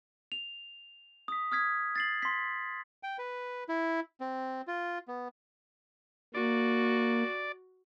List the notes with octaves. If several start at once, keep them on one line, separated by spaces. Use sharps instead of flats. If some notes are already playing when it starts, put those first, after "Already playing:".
F7
D#6 B6
D#6 F6 G#6 B6
A6 C7 F#7
C6 B6
G5
B4
E4
C4
F4
B3
A#3 F#4 D5